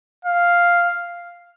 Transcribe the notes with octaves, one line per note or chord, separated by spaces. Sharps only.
F5